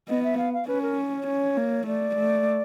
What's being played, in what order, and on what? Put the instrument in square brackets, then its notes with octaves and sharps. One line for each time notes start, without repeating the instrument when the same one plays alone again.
[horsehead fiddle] B3 [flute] D#5
[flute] E5
F5
F5
[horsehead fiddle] C#4 [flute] B4
[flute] A#4
C#5
[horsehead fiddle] C#4
A#3
[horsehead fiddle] A3 [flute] D5
[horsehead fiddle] A3